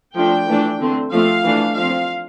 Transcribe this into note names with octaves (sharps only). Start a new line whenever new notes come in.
F3 A3 D4 G5
E3 A3 D4
D3 A3 C4
F3 A3 C4 F5
E3 A3 D4
F3 C4 F5